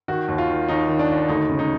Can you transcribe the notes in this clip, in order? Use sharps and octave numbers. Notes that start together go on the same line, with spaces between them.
D#3 F#4
D#2
F4
D#3
D#2 D#4
D#3
D4
D#2
D2 D#4
C#3
D#4